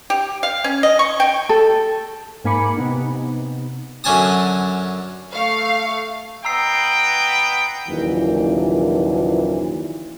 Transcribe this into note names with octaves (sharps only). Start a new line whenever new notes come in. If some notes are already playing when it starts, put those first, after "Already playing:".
G4
F5
C#4
D#5
C#6
G5
A4
G#2 A#3 G#5 B5 D6 C#7
C3 B3 D#4
F#2 D3 C#4 G#5 A5 D#6
A3 F5 C#6
B3 D#5 G5 A#5 E6 C7
F#1 D#2 A#2 E3 F3